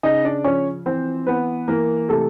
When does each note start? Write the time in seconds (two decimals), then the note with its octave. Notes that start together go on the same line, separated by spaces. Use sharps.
0.03 C#3 D#4 D#5
0.25 D4 D5
0.44 F3 C#4 C#5
0.86 E3 C4 C5
1.27 E3 B3 B4
1.68 E3 A#3 A#4
2.09 C3 A3 A4